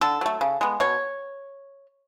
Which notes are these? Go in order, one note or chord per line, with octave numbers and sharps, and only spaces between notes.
D3 A4
F#3 A3
C#3
G#3 B3
B2 C#5